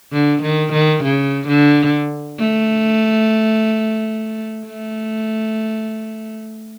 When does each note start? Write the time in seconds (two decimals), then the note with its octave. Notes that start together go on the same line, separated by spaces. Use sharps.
0.13 D3
0.43 D#3
0.73 D#3
1.04 C#3
1.48 D3
2.39 A3
4.67 A3